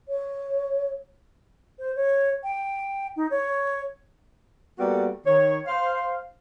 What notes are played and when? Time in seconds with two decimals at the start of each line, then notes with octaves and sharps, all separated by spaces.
0.08 C#5
1.79 C5
1.96 C#5
2.44 G5
3.16 D#4
3.31 C#5
4.79 G3 A#3 B3 F#4 A4
5.26 D#3 C#5
5.67 C5 F5